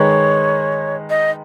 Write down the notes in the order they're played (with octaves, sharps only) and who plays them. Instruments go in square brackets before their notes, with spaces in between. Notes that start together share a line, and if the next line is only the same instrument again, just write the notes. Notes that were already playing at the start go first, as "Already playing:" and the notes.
Already playing: [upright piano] D#3 G#3 D#4 G#4 B4 [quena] C#5
[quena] D#5